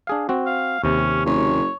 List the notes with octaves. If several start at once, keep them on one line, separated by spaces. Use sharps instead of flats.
D4 G#4 F5
C4 F#4
F5
D#2 C3 C#4
F#1 C#5